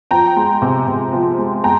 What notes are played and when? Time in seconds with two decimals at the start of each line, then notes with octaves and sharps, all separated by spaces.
0.11 F3 G5 A#5
0.36 G#3
0.62 C3
0.88 C3
1.13 F3
1.38 G#3
1.64 G#3 G5 A#5